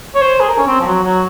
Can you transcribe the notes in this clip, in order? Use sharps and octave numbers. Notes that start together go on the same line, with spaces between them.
C#5
C5
G#4
A#4
C#4
C4
F3
F#3
F#3